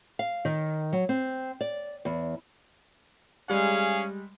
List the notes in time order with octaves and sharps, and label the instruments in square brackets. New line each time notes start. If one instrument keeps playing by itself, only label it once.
[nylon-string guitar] F5
D#3
F#3
C4
D5
E2
[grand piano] G3 G#3 [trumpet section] C#4 G#4 F5